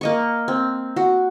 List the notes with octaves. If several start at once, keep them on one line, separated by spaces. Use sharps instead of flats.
A#3 D#5 C#6
C4
F#4